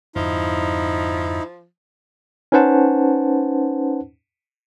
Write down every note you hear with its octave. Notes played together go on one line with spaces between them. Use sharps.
F2 G#2 D3 F3 D#4 E4
C#4 D#4 B4 C5 F#5 A5